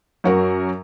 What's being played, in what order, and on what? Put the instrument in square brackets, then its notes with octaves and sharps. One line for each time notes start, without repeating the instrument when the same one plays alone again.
[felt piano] F#2 F#4 A#4